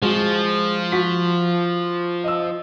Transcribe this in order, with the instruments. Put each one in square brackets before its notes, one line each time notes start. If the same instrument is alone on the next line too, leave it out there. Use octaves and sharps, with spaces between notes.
[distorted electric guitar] F3 [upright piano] G#3 F#4
[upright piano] F#4 B6
D#5 E6